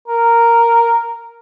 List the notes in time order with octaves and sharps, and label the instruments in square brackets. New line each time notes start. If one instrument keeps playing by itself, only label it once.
[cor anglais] A#4